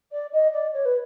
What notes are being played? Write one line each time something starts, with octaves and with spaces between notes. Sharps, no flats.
D5
D#5
D5
C#5
B4